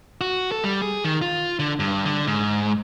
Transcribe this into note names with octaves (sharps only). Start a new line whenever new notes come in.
F#4
A4
G3
G#4
D#3
F4
D3
G2
D3
G#2